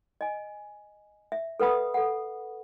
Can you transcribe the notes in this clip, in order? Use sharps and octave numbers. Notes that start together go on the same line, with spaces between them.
D#5 G#5
E5
A4 B4 F#5 B5 D#6
A4 F#5